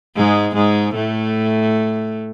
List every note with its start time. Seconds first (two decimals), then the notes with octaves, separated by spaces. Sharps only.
0.16 G#2 G#3
0.55 G#2 G#3
0.95 A2 A3